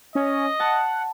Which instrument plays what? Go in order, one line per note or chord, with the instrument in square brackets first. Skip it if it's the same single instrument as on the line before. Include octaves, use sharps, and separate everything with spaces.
[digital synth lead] C#4 [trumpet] D#5
[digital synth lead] F#5 [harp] A5